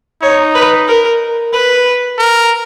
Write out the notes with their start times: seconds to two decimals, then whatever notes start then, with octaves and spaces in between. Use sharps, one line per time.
0.22 D#4 C#5
0.55 B4
0.88 A#4
1.53 B4
2.18 A#4